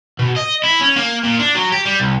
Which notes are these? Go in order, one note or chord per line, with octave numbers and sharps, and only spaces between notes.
B2
D#5
E4
C#4
A#3
A#2
D4
F#3
G4
G3
C2